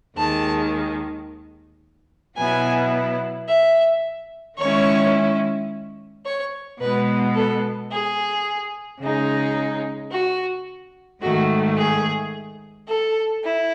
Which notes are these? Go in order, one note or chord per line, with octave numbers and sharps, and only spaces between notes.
D#2 D#3 G#3 A5
B2 F#3 B3 E4 G#5
E5
D#3 G#3 C#4 E4 C#5
C#5
B2 G#3 B3 B4
A4
G#4
C#3 G#3 D#4
F#4
G#2 D#3 A3 F#4
G#4
A4
E4